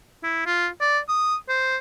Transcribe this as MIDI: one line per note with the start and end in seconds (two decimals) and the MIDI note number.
0.23 0.42 64
0.46 0.68 65
0.81 0.99 74
1.09 1.36 87
1.49 1.77 72